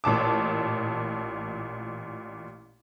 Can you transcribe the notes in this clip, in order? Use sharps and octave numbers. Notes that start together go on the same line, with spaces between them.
A1 A#2 A5 D6